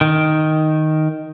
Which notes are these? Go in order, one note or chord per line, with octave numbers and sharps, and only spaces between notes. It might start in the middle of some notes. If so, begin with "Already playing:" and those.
D#3